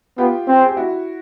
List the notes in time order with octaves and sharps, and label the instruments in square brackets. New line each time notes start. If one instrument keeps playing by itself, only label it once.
[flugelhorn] B3 [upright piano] F4 G4
[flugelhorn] C4
[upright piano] G#4
G4
E4 F#4